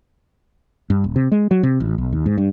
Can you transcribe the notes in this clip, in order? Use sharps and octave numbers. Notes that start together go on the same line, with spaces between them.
G2
D#1
C3
G#3
F#3
C3
A1
B1
D#2
G#2
G2